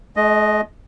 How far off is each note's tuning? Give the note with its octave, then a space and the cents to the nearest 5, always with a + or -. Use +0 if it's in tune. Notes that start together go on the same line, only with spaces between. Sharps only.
G#3 +45 D#5 +0